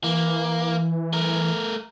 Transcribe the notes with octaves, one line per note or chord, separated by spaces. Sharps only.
E3 A#3
A3 A#4